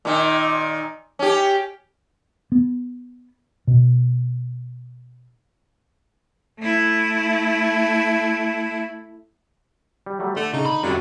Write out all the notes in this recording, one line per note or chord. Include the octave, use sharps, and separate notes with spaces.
A#2 D#3
C#4 G4
B3
B2
A3 E4
G3
F#3 G3 A3
D3 A3
C#3 D#4
B5
F2 D3 F#3 G3 C#5 E5